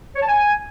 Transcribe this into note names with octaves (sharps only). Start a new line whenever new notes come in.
C#5
A5
G#5